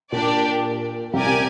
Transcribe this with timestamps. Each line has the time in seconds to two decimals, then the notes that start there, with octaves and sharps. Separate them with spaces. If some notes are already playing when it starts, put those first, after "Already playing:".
0.12 A#2 D4 G4 D5
1.13 C2 C3 G4 A#4 D5 G#5
1.27 C3